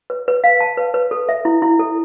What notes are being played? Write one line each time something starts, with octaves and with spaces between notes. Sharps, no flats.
B4
B4
F5
A5
B4
B4
A4
E5
E4
E4
A4